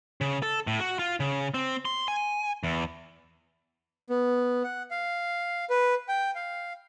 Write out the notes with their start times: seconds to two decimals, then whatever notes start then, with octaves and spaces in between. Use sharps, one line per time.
0.21 C#3
0.42 A4
0.67 A2
0.80 F#4
0.99 F4
1.20 C#3
1.54 C4
1.85 C6
2.08 G#5
2.63 E2
4.10 B3
4.64 F#5
4.91 F5
5.70 B4
6.09 G5
6.35 F5